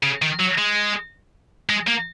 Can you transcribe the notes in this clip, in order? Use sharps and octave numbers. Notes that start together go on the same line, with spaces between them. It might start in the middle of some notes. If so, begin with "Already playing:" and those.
C#3
D#3
F#3
G#3
G#3
A#3